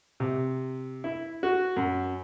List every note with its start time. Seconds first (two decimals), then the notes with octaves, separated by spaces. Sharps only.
0.20 C3
1.04 E4
1.43 F#4
1.76 F#2